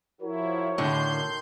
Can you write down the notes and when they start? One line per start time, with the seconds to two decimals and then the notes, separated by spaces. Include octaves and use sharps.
0.22 F3 E4 F#4 A#4 C#5
0.78 A2 D3 D#3 C6 G6